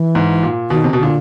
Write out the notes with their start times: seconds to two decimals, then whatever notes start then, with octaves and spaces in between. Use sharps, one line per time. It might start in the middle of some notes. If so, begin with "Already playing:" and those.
Already playing: E3
0.15 G#2
0.43 A#2
0.70 B2 D#3
0.84 C3
0.93 B2
0.98 A#2 D3